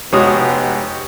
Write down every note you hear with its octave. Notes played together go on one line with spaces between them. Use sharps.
F1 G#3 B3 F#4 G4 C#5 D#6